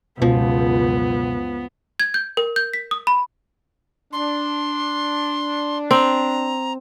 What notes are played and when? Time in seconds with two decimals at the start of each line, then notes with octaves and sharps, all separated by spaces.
0.22 C#2 F#2 B2 F3 B3
2.00 G#6
2.14 G6
2.37 A#4
2.56 G6
2.73 B6
2.91 D#6
3.07 B5
4.13 D4 C6
5.91 C4 A#5